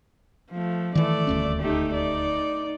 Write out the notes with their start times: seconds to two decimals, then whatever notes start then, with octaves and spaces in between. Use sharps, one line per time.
0.52 F3 A3
0.95 D#3 E3 A3 D5
1.27 D#1 D2 C#4
1.62 A3 D#4 G4
1.94 D#4 D5